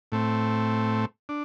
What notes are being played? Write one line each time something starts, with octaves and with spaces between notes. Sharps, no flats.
A2 A3 C4
D4